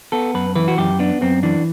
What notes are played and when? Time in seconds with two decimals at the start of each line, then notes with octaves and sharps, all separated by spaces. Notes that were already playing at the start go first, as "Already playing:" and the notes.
0.12 B3 A4
0.34 F#2 B4
0.56 E3 B4
0.68 F#4
0.78 F#2 G4
0.99 B3 D4
1.21 F#2 C4
1.43 E3 D4